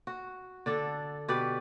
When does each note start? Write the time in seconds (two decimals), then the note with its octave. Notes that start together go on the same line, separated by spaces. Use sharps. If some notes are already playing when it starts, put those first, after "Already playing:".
0.07 F#4
0.66 D3 D4 A4
1.28 B2 G4 B4 D5